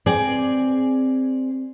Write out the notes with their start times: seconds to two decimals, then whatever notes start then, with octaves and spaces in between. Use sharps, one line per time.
0.06 C4 G#4 D5